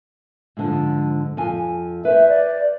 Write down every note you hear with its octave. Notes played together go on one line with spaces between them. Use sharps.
G#2 D3 F3
F2 G#5
B4 C5 E5
D5